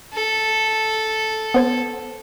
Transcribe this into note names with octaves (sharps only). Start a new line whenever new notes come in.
A4
B3 C5 G#6